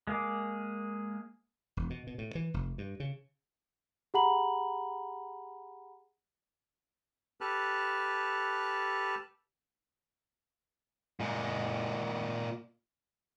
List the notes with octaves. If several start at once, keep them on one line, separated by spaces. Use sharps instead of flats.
G#3 A#3 G#4 D6
E1
B2
B2
A2
E3
F1
G2
C#3
G4 G#4 F#5 A#5 B5 F#7
G4 A4 B4 A5 F6 F#6
A#2 G#3